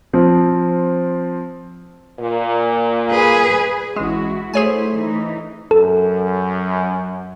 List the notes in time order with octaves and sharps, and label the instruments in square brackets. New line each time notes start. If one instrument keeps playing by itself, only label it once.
[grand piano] F3 C4
[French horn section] A#2
[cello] G#4 B4
[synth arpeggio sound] A1 G#3 [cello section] E4 F#4
[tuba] A3 [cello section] E4 C5 [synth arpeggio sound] G#4 C#5 G#5
[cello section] E3 D#4
[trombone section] F#2 [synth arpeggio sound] A4